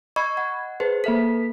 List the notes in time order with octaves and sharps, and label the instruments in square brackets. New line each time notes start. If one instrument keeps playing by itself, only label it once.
[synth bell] D#5 B5 G#6 [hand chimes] C#6
[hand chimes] F#5
[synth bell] G#4 B4 [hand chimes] C5
[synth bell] A#3 E5 B6 [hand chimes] A4